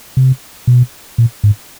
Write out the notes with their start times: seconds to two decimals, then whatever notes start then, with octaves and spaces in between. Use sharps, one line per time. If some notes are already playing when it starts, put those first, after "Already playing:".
0.17 C3
0.67 B2
1.18 A#2
1.44 G#2